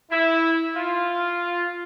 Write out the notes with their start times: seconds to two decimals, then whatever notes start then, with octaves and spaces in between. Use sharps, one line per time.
0.11 E4
0.75 F4